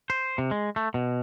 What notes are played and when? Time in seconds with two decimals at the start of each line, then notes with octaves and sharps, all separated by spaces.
0.10 C5
0.38 C3
0.51 G#3
0.76 A3
0.94 B2